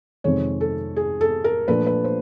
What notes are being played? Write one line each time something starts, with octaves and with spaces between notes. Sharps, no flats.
F2 C3 D#3 G#3 C#5
A4
G#4
A4
A#4
A#2 F3 A3 D4 B4
B4
C5